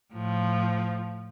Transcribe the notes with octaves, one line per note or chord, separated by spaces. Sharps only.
A2 F3